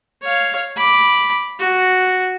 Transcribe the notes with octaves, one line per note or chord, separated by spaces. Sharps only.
C#5 F5
B5 D6
F#4